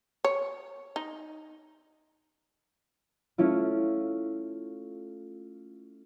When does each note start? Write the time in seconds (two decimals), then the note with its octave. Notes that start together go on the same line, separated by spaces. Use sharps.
0.25 C#5
0.96 D#4
3.38 A3 C#4 E4 F4